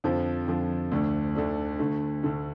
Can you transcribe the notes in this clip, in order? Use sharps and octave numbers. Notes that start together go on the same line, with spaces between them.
F2 D3 F3
F2 D3 F3
D2 D3 A3 D4
D2 D3 A3 D4
D2 D3 A3
D2 D3 A3